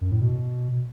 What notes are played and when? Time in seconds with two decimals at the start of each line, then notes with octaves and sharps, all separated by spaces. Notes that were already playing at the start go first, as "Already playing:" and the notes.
0.01 F#2
0.11 A2
0.21 B2